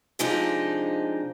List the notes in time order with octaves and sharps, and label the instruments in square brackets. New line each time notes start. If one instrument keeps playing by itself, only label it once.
[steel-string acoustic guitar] C3 F3 G#3 D4 D#4